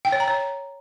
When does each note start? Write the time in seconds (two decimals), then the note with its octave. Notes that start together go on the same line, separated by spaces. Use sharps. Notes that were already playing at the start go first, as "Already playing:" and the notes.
0.05 G5
0.12 C#5
0.20 A#5
0.28 C#5